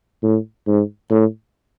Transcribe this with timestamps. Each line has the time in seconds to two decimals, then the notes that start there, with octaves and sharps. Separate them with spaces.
0.23 A2
0.68 G#2
1.11 A2